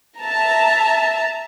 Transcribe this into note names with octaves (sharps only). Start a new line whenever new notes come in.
E5 A5 A#5